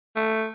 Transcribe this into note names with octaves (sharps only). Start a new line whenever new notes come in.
A3